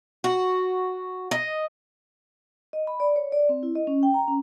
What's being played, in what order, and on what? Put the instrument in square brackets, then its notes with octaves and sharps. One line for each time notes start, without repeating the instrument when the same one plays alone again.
[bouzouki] F#4
D#5
[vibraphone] D#5
B5
D5
C#5
D5
C4
E4
D#5
C#4
G5
A#5
C#4